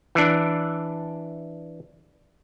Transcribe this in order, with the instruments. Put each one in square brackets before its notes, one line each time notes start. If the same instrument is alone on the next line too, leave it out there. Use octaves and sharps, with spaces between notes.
[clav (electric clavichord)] E3 D4